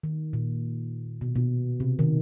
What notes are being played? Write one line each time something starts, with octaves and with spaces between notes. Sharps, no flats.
D#3
A#2
B2
B2
C3
D#3